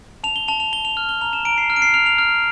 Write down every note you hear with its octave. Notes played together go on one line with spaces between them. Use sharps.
A5 F7
G7
A5 F7
F7
A5 G7
F7
F6
G7
A#5 F7
E7
A#5 D7
C7
F6
D7
C7
F6 F7
F7
F6